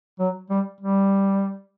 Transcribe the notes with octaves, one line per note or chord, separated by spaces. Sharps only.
F#3
G3
G3